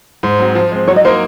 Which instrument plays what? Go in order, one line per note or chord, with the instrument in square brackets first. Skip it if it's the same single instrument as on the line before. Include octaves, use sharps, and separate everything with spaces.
[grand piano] G#2 [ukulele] C5
[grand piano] F#3 C4
F3
G#3 C4
[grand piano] F#3 [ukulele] C#5
[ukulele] D#5
[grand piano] A#3 D#4 A#4 [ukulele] C5